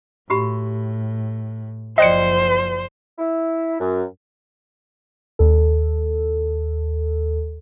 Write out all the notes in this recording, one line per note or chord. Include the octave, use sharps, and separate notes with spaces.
A2 F#4 G4 B5
F#1 F3 C5 D5 D#5 G5 F#6 C#7
E4
F#2
D#2 A4